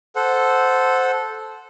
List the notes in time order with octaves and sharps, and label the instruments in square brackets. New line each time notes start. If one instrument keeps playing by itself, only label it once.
[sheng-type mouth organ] A4 C5 F#5